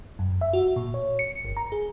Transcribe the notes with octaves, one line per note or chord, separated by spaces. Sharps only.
F#2
E5
F#4
A#2
C#5
C#7
G1
A#5
G#4